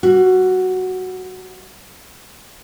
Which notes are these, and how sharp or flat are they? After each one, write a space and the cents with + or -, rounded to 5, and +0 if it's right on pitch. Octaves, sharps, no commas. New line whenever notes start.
G3 -25 F#4 +0